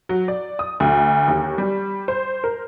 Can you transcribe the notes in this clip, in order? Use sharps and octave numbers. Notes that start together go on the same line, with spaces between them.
F#3
D5
D#6
D2
D#2
G3
C5
A#4